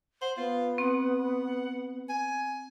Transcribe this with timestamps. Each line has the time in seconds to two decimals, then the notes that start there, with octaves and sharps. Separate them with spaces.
0.22 C5 F#5
0.37 B3 F4
0.78 C4 F#5
2.09 G#5